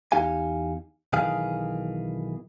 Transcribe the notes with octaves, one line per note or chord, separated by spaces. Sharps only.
E2 D#4 G4 F5 G#5
B1 D#3 E3 G#4 F5